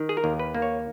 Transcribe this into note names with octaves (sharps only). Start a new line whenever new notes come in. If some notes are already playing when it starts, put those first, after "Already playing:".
Already playing: D#3
G#4
A#4
D#2
B4
A#3
C#5